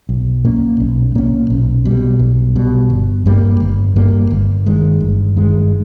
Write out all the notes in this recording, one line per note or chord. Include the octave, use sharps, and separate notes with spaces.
B1
A#2 A#3 C#4
B1
A#2 A#3 C#4
B1
B2 G3
B1
B2 G3
G1
G2 G3 A#3
G1
G2 G3 A#3
G1
G2 D#3 G#3
G1
G2 D#3 G#3